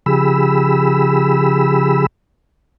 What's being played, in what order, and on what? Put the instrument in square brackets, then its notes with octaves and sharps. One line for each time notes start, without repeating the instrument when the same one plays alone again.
[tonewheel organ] C#3 F3 G4 G#4 B5 E6